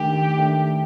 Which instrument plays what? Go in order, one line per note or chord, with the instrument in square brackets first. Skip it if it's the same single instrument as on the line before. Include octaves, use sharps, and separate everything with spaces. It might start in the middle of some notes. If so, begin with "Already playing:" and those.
Already playing: [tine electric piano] D#3 A3 D4 [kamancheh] G4
[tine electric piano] D#3 A3 D4